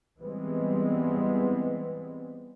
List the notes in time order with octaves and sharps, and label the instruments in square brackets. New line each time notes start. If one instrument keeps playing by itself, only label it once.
[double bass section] E3 G3 G#3 B3 C4